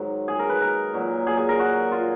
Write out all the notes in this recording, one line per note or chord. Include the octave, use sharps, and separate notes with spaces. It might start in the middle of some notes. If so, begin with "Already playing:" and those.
Already playing: G#2 D#3 F#3
G#4
A#4
B4
A#4
A#2 F#3
G#4
G#4
A#4
F#4
F4